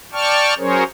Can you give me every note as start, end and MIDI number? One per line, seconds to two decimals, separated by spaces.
0.13 0.54 74
0.13 0.54 79
0.13 0.54 81
0.13 0.54 85
0.13 0.54 89
0.58 0.84 54
0.58 0.84 61
0.58 0.84 68
0.58 0.84 70
0.58 0.84 72
0.58 0.84 73